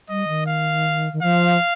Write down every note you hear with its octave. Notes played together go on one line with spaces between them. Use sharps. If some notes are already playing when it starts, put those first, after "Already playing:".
G3 D#5
D#3
F5
D#3
F3 F5